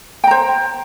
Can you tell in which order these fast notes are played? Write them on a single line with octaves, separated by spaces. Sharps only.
G5 A#5 C5